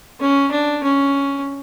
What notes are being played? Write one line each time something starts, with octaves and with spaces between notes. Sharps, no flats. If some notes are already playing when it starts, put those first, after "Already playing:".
C#4
D4
C#4